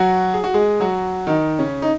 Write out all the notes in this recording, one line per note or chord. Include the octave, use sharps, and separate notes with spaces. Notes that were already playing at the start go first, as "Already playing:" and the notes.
Already playing: F#3 F#4
G#4
F#4
G#3 G#4
F#3 F#4
D#3 D#4
C#3 C#4
D#4